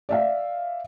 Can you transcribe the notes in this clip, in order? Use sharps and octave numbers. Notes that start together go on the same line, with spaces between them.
D5 E5 F5